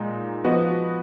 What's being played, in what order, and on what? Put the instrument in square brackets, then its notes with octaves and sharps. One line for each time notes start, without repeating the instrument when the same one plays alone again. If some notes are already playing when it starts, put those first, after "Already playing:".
Already playing: [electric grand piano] A#2 G#3 D#4
F3 B3 F#4 B4 D#5